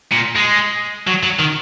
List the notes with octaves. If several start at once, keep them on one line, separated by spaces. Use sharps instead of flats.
A#2
G#3
F#3
F#3
D#3